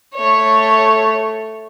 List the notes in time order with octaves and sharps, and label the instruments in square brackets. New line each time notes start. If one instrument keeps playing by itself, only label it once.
[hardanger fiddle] A3 C#5